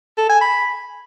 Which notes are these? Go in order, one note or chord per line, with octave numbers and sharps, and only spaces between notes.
A4
G#5
B5